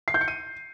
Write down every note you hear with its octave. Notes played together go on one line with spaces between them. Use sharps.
C7
G6
C#7
D#7